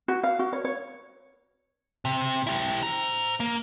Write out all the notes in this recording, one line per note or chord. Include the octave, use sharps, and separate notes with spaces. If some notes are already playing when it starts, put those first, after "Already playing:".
F#4
F5
F#4
C#5
C#5
C3
E4 G4
C5 A#5
A#3